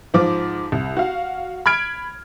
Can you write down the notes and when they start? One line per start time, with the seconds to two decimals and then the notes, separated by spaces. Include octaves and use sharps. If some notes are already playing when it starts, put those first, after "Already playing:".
0.14 G#2 F3 D6
0.72 C2
0.97 F#4 F5
1.66 B5 F6 G#6 D7